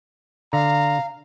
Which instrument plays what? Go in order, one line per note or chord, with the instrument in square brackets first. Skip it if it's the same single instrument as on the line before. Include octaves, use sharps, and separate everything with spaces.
[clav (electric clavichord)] D3 [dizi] F5 [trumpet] A#5